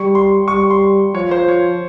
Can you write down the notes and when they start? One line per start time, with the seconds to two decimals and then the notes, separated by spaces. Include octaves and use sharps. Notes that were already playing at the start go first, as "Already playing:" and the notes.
Already playing: G3 C#6
0.15 C6
0.48 G3 C#6
0.70 C6
1.14 F3 C#5
1.31 C5
1.48 C#5